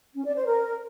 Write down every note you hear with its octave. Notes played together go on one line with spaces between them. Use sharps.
C#4
D5
C5
A#4